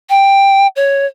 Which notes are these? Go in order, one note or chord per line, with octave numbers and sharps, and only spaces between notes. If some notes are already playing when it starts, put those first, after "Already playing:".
G5
C#5